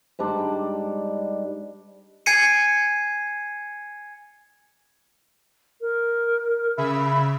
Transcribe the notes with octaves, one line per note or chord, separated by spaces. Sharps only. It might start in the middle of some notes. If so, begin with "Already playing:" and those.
G#2 G3 D4
G#5 G#6 C7 C#7 D#7
A#4
C#3 E5 B5